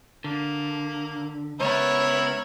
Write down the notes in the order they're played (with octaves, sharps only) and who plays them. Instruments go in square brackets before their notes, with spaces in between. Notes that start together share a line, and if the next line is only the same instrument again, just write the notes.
[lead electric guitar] D3 [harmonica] A#3
[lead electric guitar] C#2 B3 [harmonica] E4 A#4 [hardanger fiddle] C#5